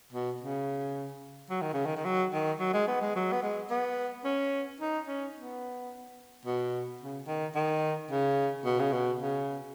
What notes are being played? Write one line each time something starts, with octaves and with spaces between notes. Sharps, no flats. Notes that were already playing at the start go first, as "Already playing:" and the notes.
B2
C#3
F#3
D#3
C#3
D#3
D#3
F#3
D#3
F#3
G#3
B3
G#3
F#3
B3
G#3
B3
C#4
D#4
C#4
B3
B2
C#3
D#3
D#3
C#3
B2
C#3
B2
C#3